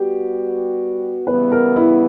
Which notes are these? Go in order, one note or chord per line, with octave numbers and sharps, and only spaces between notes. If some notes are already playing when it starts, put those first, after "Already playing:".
Already playing: G3 B3 F#4 G4
C#3 E3 G3 B3 B4
A#4
E4